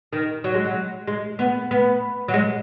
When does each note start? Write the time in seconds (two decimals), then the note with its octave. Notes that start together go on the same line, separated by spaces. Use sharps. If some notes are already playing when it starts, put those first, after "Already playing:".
0.13 D#3
0.44 F#3
0.54 G#3
0.64 F#3
1.07 G#3
1.39 B3
1.71 B3
2.28 F#3
2.34 G#3